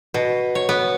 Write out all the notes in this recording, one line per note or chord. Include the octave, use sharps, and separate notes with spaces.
B2
C#5
B3